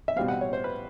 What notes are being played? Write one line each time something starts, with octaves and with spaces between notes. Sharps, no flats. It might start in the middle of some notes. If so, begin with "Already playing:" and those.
E5
B2 G3 C4 F5
F#5
C#5
C5
B4